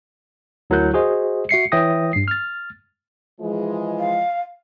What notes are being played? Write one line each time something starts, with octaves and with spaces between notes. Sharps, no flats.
D2 F#3 E4 A#4 F#6 G6
F#4 G#4 C5 D#5
F#4 E5 C7 C#7
E3 C#5 E5 G5 D#6 A#6
G2 C7
F6 A6
E3 F3 G#3
F5